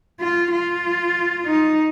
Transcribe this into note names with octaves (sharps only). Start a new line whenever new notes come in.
F4
F4
D#4